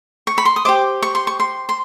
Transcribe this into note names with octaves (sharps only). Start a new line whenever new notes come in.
C#6
B5
C6
D#6
G4 C5 D#5 D6
C#6
C6
C#6
C6
C6